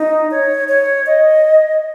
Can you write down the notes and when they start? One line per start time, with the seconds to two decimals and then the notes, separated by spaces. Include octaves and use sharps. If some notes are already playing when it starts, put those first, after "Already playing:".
Already playing: D#4
0.31 C#5
0.68 C#5
1.06 D#5